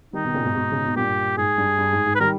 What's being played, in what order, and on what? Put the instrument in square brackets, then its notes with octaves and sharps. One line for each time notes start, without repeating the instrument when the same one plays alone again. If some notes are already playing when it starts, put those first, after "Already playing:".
[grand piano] D#3 G3 [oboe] D#4
[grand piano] B2 D#3
A#2 C#3
G#2 B2
G#2 B2
C#3
B2
[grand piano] G2 A#2 [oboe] G4
[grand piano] G#2 [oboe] G#4
[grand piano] G2
G2
G#2
G#2
[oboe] B4
[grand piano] D#3 G3 [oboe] A#4